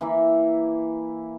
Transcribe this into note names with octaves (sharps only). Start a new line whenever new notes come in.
E3 A#3 E4